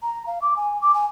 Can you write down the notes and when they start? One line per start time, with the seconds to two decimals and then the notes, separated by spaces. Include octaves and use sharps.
0.03 A#5
0.27 F5
0.42 D6
0.57 G#5
0.82 D6
0.94 G#5